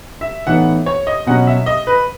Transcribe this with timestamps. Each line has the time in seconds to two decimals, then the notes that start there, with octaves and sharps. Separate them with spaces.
0.21 E5
0.47 A2 E3 B3 D#4 F#5
0.86 C#5
1.07 D#5
1.27 B2 F#3 C#4 F#5
1.47 E5
1.66 D#5
1.87 B4